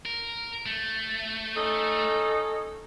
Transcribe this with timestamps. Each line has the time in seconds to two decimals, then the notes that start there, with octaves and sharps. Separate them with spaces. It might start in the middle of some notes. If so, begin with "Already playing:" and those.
0.05 A#4
0.66 A3
1.56 C#4 D#4 A4